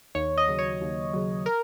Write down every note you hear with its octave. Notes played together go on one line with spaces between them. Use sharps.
D#2 C#5
D#5
C#3 F#3
C#5
D#2
C#3 F#3
A#4